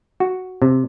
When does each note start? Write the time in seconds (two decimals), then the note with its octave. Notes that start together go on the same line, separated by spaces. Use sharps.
0.20 F#4
0.62 C3